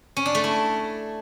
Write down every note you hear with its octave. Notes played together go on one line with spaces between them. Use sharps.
C#4
D4
A3
E4